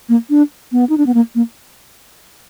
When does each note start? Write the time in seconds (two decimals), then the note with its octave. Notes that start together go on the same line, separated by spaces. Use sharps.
0.09 A#3
0.30 D4
0.72 B3
0.89 D#4
0.98 D4
1.06 B3
1.14 A#3
1.35 A#3